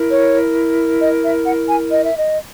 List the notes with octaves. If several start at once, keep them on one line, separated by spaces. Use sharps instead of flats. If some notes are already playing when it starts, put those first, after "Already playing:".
Already playing: E4 A#4
C#5
D#5
E5
F#5
G#5
D#5
E5
D#5